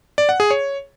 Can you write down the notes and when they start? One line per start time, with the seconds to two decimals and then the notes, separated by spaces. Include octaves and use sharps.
0.18 D5
0.29 F#5
0.40 G#4
0.51 C#5